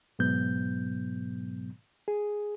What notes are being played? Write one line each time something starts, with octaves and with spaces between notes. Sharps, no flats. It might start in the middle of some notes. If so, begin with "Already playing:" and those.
G#2 B2 F#3 B3 G6
G#4